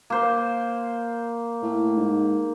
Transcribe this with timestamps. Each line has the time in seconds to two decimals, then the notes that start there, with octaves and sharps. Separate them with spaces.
0.10 A#3 C5
1.63 A2
1.96 G#2